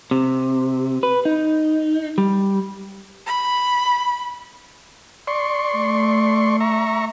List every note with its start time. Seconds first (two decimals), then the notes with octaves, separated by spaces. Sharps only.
0.11 C3
1.03 B4
1.25 D#4
2.18 G3
3.26 B5
5.27 D5 C6 C#6
5.75 A3
6.60 E5 A#5 C#6